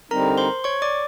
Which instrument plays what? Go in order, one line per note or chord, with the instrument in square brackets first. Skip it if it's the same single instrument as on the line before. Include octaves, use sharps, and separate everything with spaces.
[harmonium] D3 G3 C4 D#4 [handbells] A#4 A#5
[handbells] C5 C6
C#5 C#6
D5 D6